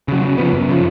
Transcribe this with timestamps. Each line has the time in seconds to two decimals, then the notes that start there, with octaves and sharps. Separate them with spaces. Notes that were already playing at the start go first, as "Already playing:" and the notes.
0.08 C#3 F#3
0.23 C#3
0.38 F3 B3
0.53 F#2
0.68 C#3 F3